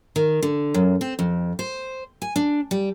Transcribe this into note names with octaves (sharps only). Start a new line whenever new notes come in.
D#3
D3
F#2
C4
F2
C5
G#5
D4
G3